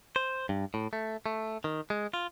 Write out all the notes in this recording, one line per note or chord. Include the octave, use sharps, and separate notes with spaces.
C5
G2
A2
A3
A3
D#3
G#3
F4